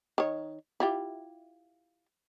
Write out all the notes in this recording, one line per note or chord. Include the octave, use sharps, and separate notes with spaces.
D#3 C#5
E4 F4 G4